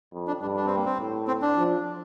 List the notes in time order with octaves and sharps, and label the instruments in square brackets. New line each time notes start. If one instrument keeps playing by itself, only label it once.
[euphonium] F2
[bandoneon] D4
[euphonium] G2 [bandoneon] D4
[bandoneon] D4
C4
A#3
C4
[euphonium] A2
[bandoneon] C4
D4
[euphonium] F3